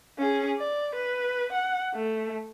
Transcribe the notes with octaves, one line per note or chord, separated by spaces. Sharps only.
C#4 G#4
D5
B4
F#5
A3